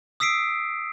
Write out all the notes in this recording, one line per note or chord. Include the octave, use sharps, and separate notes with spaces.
D#6 E6 B6 C7 D7